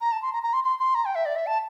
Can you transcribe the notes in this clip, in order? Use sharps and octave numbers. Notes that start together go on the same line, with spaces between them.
A#5
A5
C6
A#5
A#5
C6
C6
C6
A#5
G5
E5
D5
E5
A5